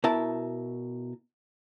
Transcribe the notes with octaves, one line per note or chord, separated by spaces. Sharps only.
B2 E4 A#4 E5 A5